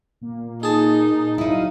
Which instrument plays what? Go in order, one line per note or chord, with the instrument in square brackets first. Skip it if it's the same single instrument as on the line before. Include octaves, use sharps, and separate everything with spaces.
[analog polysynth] A#2 A#3
[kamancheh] D#4 [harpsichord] G#4 A5
[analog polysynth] F#3 F5 D#7 [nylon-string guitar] D#4 E4